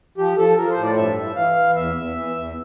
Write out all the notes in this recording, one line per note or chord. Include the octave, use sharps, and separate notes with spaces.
F3 G4
F3 A4
F3 A#4
C5
A2
D5
G2 E5
E3
E3 F5
E3
E2 E5
E2
E3
E2